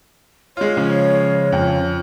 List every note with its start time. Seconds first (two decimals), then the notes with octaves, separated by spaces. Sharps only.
0.57 G#3 F4 C#5
0.77 C#3 F3 C#4
1.52 F2